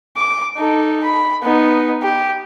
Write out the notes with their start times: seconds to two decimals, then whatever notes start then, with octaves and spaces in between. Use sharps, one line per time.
0.16 D6
0.56 D#4 A4
1.03 B5
1.42 B3 D#4
2.02 G4